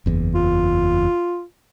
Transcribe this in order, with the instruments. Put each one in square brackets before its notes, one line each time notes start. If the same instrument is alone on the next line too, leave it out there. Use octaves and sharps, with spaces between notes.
[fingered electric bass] F#1 E2
[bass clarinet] F4